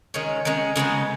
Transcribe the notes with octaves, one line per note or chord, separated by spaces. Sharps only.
D#3 G#3 C#4
D#3 G#3 C#4
C#3 G#3 B3 D#4